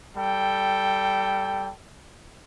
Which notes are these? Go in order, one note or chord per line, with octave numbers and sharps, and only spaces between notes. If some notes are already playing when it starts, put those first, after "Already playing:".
G3 A4 G5